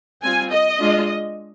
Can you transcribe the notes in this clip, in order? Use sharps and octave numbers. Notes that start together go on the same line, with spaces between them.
G3 C4 F4 G#5
D#5
G#3 D4 F4